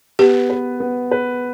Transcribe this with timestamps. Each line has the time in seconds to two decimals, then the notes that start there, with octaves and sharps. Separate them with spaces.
0.19 B3 G4
0.50 B4
0.80 B3
1.11 B4